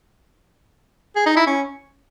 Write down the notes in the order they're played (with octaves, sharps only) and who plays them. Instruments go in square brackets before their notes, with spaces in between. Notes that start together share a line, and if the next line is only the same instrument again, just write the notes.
[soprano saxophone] G#4
D#4
E4
C#4